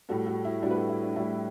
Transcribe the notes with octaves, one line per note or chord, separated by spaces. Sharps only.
A2 G3 F#4 A4
F#4 A4
E4
A2 G3 D4 F#4
B4
F#4 A4
E4
D4
A2 G3 E4